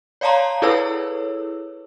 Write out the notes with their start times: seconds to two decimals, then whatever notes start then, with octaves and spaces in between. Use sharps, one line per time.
0.21 C#5 D5 F5 A5 A#5 C6
0.62 E4 G#4 A4 B4 C#5 E6